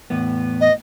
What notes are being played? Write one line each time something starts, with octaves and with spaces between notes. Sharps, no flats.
E2 A2 B3
D#5